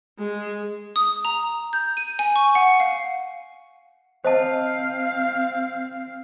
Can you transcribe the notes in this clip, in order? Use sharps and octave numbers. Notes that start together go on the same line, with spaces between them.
G#3
D#6
A#5
G6
D#7
G#5
C#6
F#5
F5
C4 C5 D#5 F5 A5